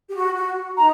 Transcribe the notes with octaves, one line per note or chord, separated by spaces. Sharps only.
G4
F#4
F#4
D#4 A#5